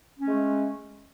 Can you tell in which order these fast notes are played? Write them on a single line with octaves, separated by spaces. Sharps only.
C#4 A3 G#3